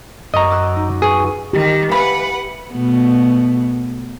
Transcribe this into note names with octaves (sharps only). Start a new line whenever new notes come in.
F#2 D#5 A#5 C#6
D6 E6 F#6
D#4
G#4 B4 C#6 D#7
D#3 G4
E3 B4 F5 F#5 B5
B2 A3 B3